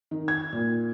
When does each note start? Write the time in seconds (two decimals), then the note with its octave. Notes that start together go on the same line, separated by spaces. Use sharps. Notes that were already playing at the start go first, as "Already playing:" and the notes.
0.11 D#3
0.28 G#6
0.53 A#2